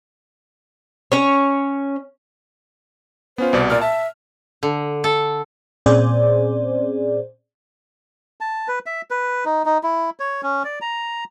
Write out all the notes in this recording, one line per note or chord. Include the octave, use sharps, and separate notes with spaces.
C#4 C#5
B3 C#4 F4 C5
C2 B2 D5
A#2 A#4 D5 F6
E5 A5
D3
A4
A#2 C4 C#4 G#4 C5 D5
A5
B4
E5
B4
D#4
D#4
E4
C#5
C#4
D5
A#5